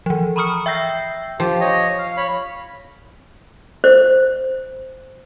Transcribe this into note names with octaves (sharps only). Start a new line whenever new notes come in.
E3 F3
A#5 B5 C#6 D#6 F6 C#7
E5 G5 E6 G6 A#6 C7
F3 G4
C#5 D#5
F5
C#5 B5
C5